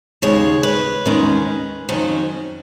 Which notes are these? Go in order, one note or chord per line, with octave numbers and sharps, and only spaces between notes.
D#2 C#3 G#3 C#5
B4
D#2 D#3 G#3 C#4
F2 D#3 F#3 C#4